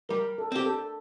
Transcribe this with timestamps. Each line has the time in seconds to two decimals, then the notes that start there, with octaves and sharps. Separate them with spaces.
0.09 G3 A#4
0.38 A4
0.52 C4 G4
0.66 A4